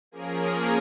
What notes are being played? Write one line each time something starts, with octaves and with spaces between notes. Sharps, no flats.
F3 A#3 C#4 G#4 A#4